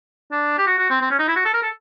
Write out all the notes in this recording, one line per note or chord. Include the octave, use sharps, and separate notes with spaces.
D4
G4
F#4
F#4
C4
C4
C#4
D#4
E4
F#4
A4
A#4
A4